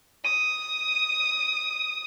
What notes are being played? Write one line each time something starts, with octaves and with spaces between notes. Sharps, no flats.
D#6 D#7